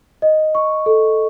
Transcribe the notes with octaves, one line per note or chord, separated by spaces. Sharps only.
D#5
C#6
A4